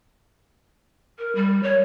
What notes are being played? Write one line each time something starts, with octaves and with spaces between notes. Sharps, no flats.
A#4
G3
C#5